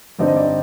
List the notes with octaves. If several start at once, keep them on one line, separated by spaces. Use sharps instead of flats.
G2 D3 G3 C4 D#4 D5
D#5
D5